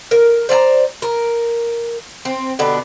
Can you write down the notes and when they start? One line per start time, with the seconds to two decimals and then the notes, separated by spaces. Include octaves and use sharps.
0.11 A#4
0.49 C5 D5 G#5 A#5
1.02 A#4
2.25 C4
2.59 B2 D3 B3 G4